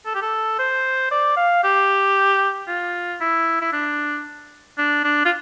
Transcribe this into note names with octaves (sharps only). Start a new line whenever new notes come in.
A4
G4
A4
C5
D5
F5
G4
F4
E4
E4
D4
D4
D4
F4